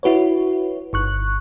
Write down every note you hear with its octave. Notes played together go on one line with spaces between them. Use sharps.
E4 F#4 B4 C#5
G1 C#6 F#6